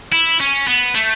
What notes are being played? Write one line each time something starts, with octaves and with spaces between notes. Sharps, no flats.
E4
C#4
B3
A3